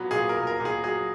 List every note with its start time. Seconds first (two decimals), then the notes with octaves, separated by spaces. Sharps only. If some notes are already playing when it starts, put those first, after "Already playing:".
Already playing: A#2 F#3 B3
0.11 A#2 G#4
0.29 A#4
0.36 A#2
0.47 A#4
0.60 A#2
0.65 G#4
0.83 F#3 G#4